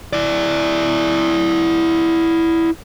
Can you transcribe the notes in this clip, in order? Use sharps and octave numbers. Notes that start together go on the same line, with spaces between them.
E4 D5